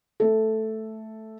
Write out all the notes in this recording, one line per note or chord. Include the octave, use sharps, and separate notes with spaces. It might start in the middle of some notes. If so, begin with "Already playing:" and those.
A3 A4